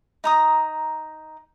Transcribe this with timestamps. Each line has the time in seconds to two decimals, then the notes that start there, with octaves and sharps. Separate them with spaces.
0.24 D#4 A#5 D#6